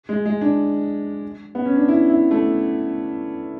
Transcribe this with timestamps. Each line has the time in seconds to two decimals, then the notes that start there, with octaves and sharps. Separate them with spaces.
0.09 G#3
0.26 G#3
0.41 D4
1.55 B3
1.65 C#4
1.76 D4
1.88 E4
2.10 E4
2.31 A3